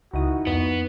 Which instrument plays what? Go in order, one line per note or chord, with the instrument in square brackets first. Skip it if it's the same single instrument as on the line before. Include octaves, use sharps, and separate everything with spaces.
[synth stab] C#2 D#6 [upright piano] D#3 D#4 E4 [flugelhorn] F#4
[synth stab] F2 [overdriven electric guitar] B3